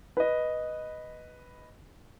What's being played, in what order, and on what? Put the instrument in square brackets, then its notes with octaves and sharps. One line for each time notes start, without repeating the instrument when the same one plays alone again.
[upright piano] B4 D#5